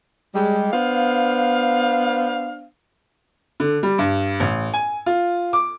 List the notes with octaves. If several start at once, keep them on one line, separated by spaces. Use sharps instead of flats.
G3 G#3
B3 D4 C5 F5
D3
G3
G2
A1
G#5
F4
D6